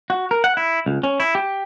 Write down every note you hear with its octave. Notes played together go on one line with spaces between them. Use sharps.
F#4
A#4
F#5
E4
C#2
C#4
E4
G4